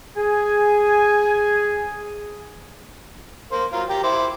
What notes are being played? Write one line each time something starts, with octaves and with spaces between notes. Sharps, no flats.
G#4 G#5
A#3 C5
F#3 F4 A#4
G4 G5 A#5
E4 C5 D6